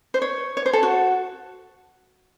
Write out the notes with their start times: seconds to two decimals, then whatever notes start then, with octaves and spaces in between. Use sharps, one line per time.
0.14 C5
0.22 C#5
0.57 C#5
0.66 C5
0.73 A4
0.83 F#4